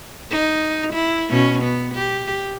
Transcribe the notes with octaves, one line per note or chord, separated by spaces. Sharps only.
D#4
E4
B2 C#4
B3
G4